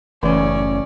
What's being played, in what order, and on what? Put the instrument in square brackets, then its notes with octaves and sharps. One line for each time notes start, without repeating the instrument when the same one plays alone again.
[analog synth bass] F#1 [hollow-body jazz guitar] A2 C#3 [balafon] E3 [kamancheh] C#4 D5